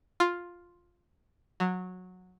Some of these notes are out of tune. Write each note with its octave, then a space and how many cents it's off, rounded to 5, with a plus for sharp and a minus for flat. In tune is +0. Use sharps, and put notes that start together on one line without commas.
F4 +5
F#3 -15